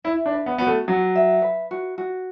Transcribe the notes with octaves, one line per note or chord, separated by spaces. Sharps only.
E4 E5
D4
B4
B3
B3 F#4
A3
F#3 F#4
E5
B4
F#4
F#4